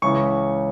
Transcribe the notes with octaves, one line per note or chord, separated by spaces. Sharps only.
C#2 C#3 E3 C#6